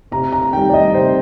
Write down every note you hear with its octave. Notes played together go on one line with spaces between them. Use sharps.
C3 A#5
A#5
D#3 G3 G5
D5
D#5
C3 C5